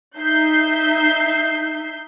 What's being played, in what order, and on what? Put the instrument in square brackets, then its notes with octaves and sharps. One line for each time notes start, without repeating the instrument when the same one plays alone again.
[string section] D#4 E5 G6 C7